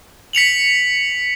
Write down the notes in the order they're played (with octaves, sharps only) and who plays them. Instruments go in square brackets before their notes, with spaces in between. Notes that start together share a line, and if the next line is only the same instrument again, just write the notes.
[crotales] B6 C#7 F7 F#7